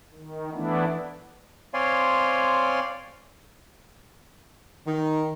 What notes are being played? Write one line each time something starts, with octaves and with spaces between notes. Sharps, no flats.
D#3
E3 A3 B3 D4 E4
C4 C#5 D5 F5 G#5 C6
D#3